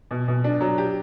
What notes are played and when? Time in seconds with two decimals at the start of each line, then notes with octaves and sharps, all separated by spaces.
0.11 B2
0.28 B2
0.44 D4
0.61 F#3
0.78 G4